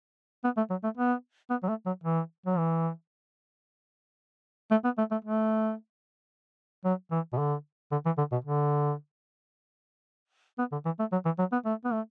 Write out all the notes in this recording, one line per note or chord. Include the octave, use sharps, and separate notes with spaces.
B3
A3
F#3
A3
B3
B3
F#3
A3
F#3
E3
F#3
E3
A3
B3
A3
A3
A3
F#3
E3
B2
D3
D3
E3
D3
B2
D3
B3
D3
E3
A3
F#3
E3
F#3
B3
A3
B3
A3